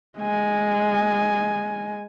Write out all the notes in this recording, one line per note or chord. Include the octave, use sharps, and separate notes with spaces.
G#3 G#5